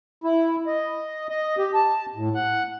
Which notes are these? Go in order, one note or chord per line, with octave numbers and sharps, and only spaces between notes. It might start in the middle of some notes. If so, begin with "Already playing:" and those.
E4
D#5
D#5
G4
A5
A2
F#5